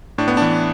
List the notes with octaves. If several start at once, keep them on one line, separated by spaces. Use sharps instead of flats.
A2 D4
B3
E3 D4